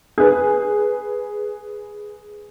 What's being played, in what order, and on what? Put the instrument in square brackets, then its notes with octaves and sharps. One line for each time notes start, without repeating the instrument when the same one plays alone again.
[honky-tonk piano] G#4 B4